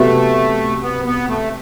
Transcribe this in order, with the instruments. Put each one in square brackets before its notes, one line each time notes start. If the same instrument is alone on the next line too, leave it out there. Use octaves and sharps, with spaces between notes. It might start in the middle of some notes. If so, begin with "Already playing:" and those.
Already playing: [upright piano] C3 F#3 B3 F#4 [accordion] A3
[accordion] B3
B3
A3